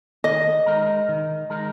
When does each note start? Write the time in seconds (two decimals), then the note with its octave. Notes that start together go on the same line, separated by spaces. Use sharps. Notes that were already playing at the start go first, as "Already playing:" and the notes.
0.24 D#3 D#5
0.66 G#3 D#4 A#4
1.09 D#3
1.50 G#3 D#4 A#4